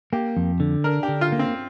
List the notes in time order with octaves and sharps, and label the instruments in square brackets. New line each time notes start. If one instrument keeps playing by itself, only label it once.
[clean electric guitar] A#3 [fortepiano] G4
[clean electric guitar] F2
D3
[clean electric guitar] D4 [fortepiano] A#4
[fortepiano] G4
[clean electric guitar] D3
[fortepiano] F4
[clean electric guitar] A#3
[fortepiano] C4